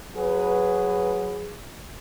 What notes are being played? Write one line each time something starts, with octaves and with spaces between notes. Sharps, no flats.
F#3 G#4 B4